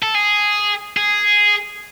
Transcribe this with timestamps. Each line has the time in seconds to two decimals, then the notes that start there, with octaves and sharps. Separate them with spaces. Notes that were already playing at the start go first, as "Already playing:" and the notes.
0.03 A4
0.15 G#4
0.97 G#4